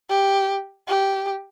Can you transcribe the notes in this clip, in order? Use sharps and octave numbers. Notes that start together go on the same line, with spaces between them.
G4
G4